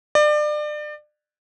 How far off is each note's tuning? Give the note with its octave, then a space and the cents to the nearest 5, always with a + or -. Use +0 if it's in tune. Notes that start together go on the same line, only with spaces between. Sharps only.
D5 +30